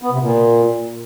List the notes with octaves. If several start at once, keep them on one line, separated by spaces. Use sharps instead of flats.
B3
C3
A#2